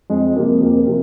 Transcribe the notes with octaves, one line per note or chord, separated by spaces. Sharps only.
F2 G#3
C3 F3 A#3
F2 A#3
A#4
C3 F3